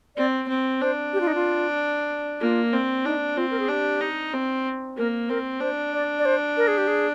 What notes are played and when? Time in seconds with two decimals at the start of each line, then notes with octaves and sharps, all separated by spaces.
0.16 C4 D5
0.48 C4
0.81 D4 C5
1.13 G4
1.21 F4
1.27 D#4
1.35 F4
2.41 A#3 F4
2.73 C4
3.05 D4 D#4
3.36 C4 F4
3.51 A#4
3.59 G#4
3.69 D4 G4
4.01 D#4
4.33 C4
4.97 A#3 A#4
5.29 C4 A#4
5.60 D4 C5
5.93 D5
6.19 D5
6.25 C5
6.57 A#4
6.68 G#4
6.78 G4
6.88 G#4